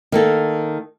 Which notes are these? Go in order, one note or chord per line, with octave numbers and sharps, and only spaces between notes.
D#3 A#3 A4